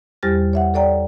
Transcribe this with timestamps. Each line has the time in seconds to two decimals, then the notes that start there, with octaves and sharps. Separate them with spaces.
0.23 E2 G3 G4 C5 F6 A6
0.53 C#5 E5 F#5
0.74 A4 C#5 D5 G5 A#5